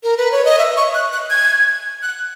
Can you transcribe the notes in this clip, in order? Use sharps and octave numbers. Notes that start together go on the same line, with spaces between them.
A#4
B4
C#5
D#5
E5
C#6
F#6
F#6
G#6
F#6